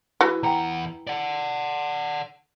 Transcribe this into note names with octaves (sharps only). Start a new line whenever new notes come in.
E3 F#4 G#4
E2 F#5 G5 A#5
D5 F#5